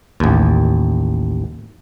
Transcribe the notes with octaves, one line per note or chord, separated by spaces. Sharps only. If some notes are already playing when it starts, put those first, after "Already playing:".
A1 D#2